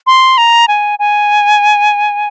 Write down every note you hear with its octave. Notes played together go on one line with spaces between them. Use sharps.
C6
A#5
G#5
G#5